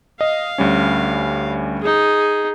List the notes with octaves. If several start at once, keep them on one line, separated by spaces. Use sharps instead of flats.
D#5 F5
D2 G3 C#4
D#4 G#4